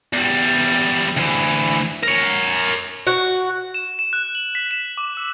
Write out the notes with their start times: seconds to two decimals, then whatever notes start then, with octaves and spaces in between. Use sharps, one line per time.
0.13 E2 G3
1.17 D2 E3
2.03 A#4 C#5
3.07 F#4
3.74 E7
3.99 E7
4.13 F#6
4.35 F#7
4.55 B6
4.71 E7
4.98 D6
5.17 E6